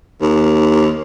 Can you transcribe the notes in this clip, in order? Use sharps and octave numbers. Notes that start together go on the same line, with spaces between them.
D#2